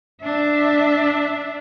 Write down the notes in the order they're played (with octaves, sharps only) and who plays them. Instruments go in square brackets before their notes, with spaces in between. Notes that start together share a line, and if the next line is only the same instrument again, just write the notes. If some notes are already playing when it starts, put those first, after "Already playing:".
[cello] D4 E5